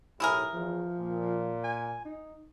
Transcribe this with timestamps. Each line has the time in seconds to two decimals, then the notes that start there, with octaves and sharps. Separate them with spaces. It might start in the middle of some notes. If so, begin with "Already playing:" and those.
0.20 B1 A2 E4 G4 G#4 A#4
0.54 E2 F3
0.99 A#2
1.64 G#5
2.05 D#4